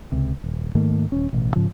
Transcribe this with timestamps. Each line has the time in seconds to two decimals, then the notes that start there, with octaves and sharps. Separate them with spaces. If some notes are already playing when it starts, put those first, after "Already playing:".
0.12 C#2 C3
0.44 D#1
0.75 G#2 D#3 A3 A#3
1.12 D#1 C#4
1.33 A1 B2
1.56 G#2 C#3 F3